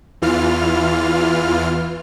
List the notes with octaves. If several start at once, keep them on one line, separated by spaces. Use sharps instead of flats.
E2 E3 F4 F6